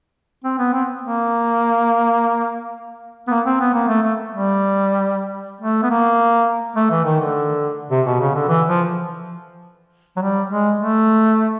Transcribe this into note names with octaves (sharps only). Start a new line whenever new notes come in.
C4
B3
C4
A#3
B3
A#3
C4
B3
A#3
A3
A3
G3
A3
B3
A#3
A3
E3
D#3
D3
C3
B2
C#3
D3
E3
F3
F#3
G3
G#3
A3